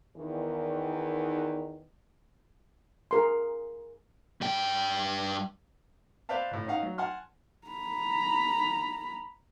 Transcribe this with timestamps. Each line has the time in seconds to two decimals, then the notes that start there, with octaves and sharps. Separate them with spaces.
0.16 E2 D#3
3.11 G#4 A#4 C6
4.41 G2 G5
6.29 B4 C5 D5 E5 F5 A5
6.51 A1 A2
6.67 C#4 D#4 F5 F#5
6.83 F#3
6.98 F#5 G#5 A5 C6 F6
7.68 A#5 B5